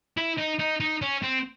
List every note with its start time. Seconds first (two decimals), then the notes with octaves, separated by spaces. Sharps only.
0.17 E4
0.38 D#4
0.59 D#4
0.80 D#4
1.02 C#4
1.23 C4